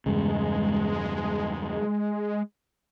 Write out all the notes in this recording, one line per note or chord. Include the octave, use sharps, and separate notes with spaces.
E2 G2 C#3 G#3